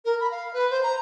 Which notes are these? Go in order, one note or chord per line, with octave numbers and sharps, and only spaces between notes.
A#4
B5
F5
B4
C5
A#5